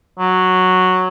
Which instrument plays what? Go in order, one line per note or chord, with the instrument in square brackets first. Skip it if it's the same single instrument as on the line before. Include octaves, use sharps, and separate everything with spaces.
[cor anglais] F#3